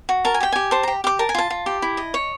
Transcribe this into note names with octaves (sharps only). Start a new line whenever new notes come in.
F#4
A#4 A5
G#5
G4 G5
G4 G#5
C5 A5
G4 A#5
G4 D6
A#4 A5
G#5
F4 A5
F4
G4
E4
D#5
C#5